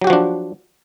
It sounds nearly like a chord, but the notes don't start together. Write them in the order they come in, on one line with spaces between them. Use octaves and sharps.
F#3 G4 F#4 F3 D4